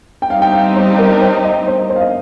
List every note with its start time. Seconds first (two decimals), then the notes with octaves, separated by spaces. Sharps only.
0.22 G5
0.30 G3 C4 D#4 G4 F5
0.42 G5
0.53 F5
0.76 C5
0.99 A#4
1.21 C5
1.36 C5
1.44 D#5
1.67 C5
1.90 C5
1.96 F5
2.01 D#5